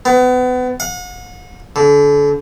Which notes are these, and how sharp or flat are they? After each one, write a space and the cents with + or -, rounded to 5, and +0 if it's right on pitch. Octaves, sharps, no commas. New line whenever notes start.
B3 +30
F#5 -40
D3 -35